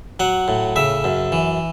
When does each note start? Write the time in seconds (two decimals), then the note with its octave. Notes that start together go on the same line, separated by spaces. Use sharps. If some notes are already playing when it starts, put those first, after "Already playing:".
0.20 F#3 F#5
0.48 A2
0.76 C#3 E5
1.04 F#2
1.32 E3